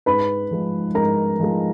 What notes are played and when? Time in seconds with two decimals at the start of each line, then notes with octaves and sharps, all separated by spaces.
0.06 G#2 B4 B5
0.51 F3 G#3
0.95 G#2 A#4 A#5
1.40 F3 G#3